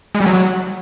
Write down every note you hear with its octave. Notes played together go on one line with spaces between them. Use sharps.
G#3
G3
F#3